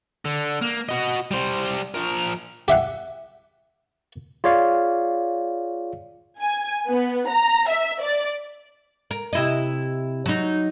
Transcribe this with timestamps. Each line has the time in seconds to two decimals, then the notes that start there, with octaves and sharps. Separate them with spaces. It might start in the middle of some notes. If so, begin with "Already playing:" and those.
0.25 D3
0.62 A#3
0.89 F#4 D#5
1.31 G3 C5
1.95 F3 A#4
2.68 G4 E5 F#5
4.44 F4 G#4 C#5 D5 F5
6.40 G#5
6.90 B3
7.31 A#5
7.70 E5
8.02 D5
9.11 A#4
9.33 C3 E4 D#5
10.26 F#3 D#4